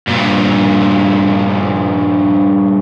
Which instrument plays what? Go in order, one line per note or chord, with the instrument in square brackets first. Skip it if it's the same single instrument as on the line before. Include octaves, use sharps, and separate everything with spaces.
[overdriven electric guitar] G2 A#2